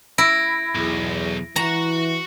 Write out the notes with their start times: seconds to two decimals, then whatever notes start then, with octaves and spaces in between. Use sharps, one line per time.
0.18 E4 A#6 D7
0.75 B1 E2
1.56 E3 F#4 F#5 A#5